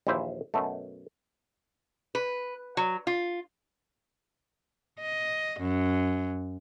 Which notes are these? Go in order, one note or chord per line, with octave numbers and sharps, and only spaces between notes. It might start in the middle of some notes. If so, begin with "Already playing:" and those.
A#1 D#2 E3 E4 C5 E5
F#2 B2 A3
B4
F#3
F4
D#5
F#2